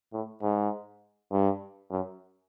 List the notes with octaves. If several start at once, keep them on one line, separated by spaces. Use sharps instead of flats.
A2
G#2
G2
F#2